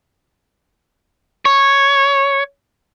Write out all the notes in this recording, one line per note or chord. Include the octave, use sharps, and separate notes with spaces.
C#5